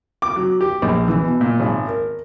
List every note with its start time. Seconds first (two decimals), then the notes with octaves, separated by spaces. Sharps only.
0.22 D6
0.36 F#3
0.61 G4
0.82 A#1
1.08 E3
1.24 B2
1.41 A#2
1.60 G#1
1.87 A#4